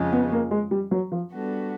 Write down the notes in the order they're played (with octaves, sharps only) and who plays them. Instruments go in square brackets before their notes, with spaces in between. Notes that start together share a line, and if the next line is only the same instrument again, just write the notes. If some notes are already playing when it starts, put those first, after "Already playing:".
Already playing: [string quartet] F2 C#3 F3 G#3
[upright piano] B3
A#3
G#3
G3
F#3
F3
[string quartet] G3 B3 D4 F#4 A4